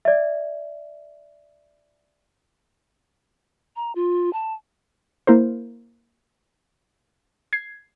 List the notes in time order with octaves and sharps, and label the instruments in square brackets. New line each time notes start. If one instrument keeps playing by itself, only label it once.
[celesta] D5 E5
[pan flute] A#5
F4
A5
[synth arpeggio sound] A#3 E4 A#4 C5
G#6 C7